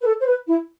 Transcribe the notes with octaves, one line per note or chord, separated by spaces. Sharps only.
B4
A4
C5
B4
E4